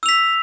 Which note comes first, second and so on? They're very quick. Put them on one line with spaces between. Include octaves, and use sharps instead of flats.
E6 F7 B6